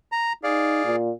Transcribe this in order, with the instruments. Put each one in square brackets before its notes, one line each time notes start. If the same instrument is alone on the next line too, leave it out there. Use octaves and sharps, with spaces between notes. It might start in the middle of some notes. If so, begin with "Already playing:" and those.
[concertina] A#5
[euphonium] D#4 [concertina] G#4 D5 F5
[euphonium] A#2